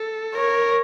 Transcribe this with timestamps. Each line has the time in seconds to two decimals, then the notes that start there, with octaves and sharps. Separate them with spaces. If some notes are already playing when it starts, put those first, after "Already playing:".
Already playing: A4
0.35 A#4 C#5